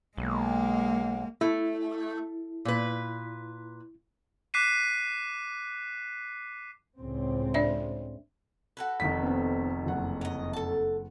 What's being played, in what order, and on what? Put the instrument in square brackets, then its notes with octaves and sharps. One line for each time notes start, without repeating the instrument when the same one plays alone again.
[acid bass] B1 [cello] G#3 A#3
[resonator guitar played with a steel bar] A3 [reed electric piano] E4
[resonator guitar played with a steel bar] A#2 B4
[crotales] D6 F#6 B6 C7 D#7
[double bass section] C#2 A2 C4
[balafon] D4 D5 E5
[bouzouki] F#4 A4 B4
[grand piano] F1 D#3 B6
[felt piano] B3 C4
F#1 F#5
[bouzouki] F#3 D#5
A4 A5